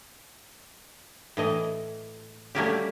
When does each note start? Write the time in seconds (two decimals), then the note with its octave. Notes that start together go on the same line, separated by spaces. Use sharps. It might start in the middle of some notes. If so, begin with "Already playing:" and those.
1.37 A2 E3 D#5
2.55 G3 A3 A#3 C#4 F#4 G4